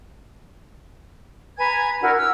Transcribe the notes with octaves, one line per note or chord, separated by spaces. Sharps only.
B4 G#5 A#5 G#6
D4 E4 F#4 A#4
E6 F6